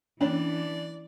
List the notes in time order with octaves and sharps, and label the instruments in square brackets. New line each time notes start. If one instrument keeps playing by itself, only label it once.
[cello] E3 [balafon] A#3 C#4 C#5 [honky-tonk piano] D4 [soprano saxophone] D5